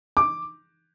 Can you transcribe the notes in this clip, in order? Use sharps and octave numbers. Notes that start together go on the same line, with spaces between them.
D6